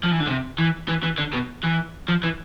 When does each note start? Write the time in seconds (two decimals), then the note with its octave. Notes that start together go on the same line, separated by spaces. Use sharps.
0.04 F3
0.11 E3
0.20 D3
0.27 C3
0.58 E3
0.88 E3
1.03 E3
1.18 D3
1.33 B2
1.63 E3
2.08 F3
2.23 E3